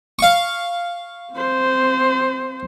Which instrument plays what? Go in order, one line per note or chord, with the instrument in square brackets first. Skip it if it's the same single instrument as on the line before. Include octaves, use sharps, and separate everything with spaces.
[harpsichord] F5 C#6
[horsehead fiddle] C4 C5